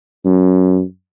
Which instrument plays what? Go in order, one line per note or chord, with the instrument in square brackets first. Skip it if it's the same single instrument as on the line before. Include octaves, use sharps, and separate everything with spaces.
[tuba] F#2